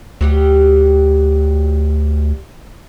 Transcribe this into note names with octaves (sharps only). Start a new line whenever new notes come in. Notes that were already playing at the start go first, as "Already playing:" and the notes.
D2 F#3 G3 G4